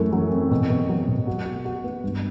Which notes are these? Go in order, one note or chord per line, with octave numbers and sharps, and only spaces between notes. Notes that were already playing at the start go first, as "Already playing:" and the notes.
Already playing: F#2 E3 A3
F#3
C4
B2
B2
F#3
B2
F#4
F#4
F#4
B3
G2